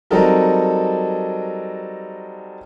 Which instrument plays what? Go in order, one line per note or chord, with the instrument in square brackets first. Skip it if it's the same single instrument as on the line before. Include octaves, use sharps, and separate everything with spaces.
[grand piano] F#3 G3 C4 D#4 A4 A#4